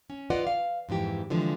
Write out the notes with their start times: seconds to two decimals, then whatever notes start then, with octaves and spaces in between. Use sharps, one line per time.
0.10 C#4
0.30 F4 B4 D5 D#5 F#5
0.47 F5
0.89 F2 G#2 E3 G4
1.30 D3 E3 F3 G3 G#3